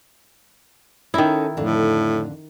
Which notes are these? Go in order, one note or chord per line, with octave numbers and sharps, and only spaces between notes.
D#3 C#4 D#4 E4 A4
F2 A2 D3